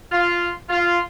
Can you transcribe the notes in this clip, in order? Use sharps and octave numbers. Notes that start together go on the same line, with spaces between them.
F4
F4